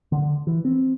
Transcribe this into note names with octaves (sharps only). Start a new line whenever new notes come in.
D3
E3
C4